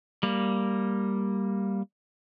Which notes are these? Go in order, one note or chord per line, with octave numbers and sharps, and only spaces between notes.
G3 A#3